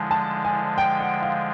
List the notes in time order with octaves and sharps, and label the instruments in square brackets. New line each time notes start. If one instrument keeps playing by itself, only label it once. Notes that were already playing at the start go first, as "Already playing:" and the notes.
Already playing: [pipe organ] D3 F3 G#3 [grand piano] G#5 A5
[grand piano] A5
G#5
G5
F#5
F5